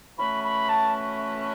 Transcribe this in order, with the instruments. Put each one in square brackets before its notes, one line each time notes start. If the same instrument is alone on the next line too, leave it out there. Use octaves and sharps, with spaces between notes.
[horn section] E3 A3 C#4 F#4 B4 [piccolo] B5
[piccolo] B5
A5